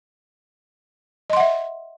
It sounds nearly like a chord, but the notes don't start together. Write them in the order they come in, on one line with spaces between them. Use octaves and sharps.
D#5 C6 F#5 E5